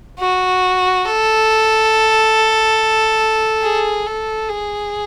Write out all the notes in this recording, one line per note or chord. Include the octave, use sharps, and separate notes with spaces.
F#4
A4
G#4
A4
G#4